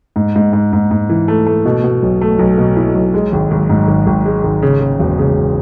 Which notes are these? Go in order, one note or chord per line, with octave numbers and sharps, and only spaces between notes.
G#2
G#2
G#2
G#2
G#2
E3
A3
A3
B2
B2
B1
A3
B1
B2
E4
B1
G#3
G#1
G#1
G#2
G#1
G#1
G#3
G#1
C#3
C#3
E1
C#3